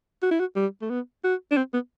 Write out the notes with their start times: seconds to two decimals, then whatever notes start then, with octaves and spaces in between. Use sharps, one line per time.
0.23 F#4
0.31 E4
0.40 F#4
0.56 G3
0.82 A3
0.90 B3
1.24 F#4
1.51 D4
1.57 C4
1.74 B3